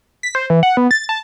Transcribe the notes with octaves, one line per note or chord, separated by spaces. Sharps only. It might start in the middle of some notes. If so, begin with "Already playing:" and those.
B6
C5
E3
F#5
B3
A6
A5